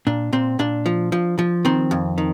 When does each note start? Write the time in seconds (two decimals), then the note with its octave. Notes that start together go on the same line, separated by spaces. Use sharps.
0.07 A#2 D4
0.33 A#2 C4
0.59 A#2 D4
0.86 F3
1.12 F3
1.39 F3
1.65 D#3 C4
1.91 F2
2.18 D#3